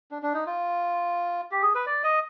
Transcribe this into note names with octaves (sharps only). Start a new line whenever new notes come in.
D4
D4
D#4
F4
G4
G#4
B4
D5
D#5